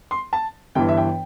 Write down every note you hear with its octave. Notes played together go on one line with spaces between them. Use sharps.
C6
A5
G1 G2 E3 G5
E5
G5